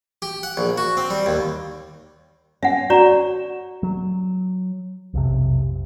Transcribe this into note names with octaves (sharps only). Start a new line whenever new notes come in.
G4
F#5
A#1
F#4
C4
G3
D#2
C#4 E5 F#5
F#4 C#5 D5 A#5
F#3
B1 F2 C3